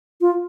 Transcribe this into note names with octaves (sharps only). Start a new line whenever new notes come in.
F4